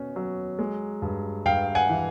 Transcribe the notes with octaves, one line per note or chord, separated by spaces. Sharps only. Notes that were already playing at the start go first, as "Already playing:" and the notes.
Already playing: B2 C#4
F#3
G#3
G2
G2 F5 G5
F#5 G#5
E3